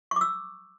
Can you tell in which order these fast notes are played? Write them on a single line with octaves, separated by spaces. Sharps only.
C#6 D6 E6